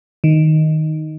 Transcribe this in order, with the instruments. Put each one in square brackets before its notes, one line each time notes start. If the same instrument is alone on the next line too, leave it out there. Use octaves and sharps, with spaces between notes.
[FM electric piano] D#3